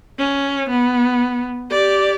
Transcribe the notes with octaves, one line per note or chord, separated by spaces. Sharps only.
C#4
B3
G4 D5